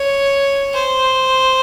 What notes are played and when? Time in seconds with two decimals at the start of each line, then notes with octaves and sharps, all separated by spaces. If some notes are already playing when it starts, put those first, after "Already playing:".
Already playing: C#5
0.74 C5